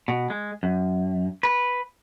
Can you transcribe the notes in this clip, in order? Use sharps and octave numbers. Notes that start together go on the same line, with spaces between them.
B2
G#3
F#2
B4